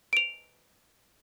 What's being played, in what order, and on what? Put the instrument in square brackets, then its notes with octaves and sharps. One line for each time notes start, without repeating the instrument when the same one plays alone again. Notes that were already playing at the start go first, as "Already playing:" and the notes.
[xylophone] D7 F7